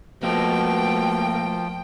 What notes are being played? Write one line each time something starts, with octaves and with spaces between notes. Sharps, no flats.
B2 F3 A3 A#3 G5